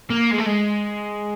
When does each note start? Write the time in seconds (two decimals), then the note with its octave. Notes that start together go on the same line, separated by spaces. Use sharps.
0.10 A#3
0.31 G#3
0.38 A3
0.46 G#3